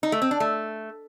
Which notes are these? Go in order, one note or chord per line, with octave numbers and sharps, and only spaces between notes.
D#4
A3
C4
D4
A3